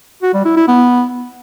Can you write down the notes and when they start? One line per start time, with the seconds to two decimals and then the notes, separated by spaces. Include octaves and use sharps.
0.22 F#4
0.34 G3
0.45 E4
0.56 E4
0.68 B3